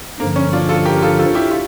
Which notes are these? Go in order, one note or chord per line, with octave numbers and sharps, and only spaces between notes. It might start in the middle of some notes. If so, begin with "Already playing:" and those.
G2 D3 F3 A#3
C#4
D4 F4
F4 A4
G4 A#4
F4 A4
F4 A4
E4 G4
F4